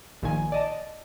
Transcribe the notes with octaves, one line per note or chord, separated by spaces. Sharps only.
A#1 A#2 D#3 G#5
D5 D#5 A5